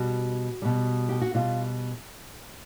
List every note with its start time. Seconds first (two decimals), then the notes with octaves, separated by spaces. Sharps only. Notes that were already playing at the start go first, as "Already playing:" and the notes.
Already playing: B2 G3 F#4
0.62 B2 G3
1.09 G4
1.21 F#4
1.34 B2 G3 F4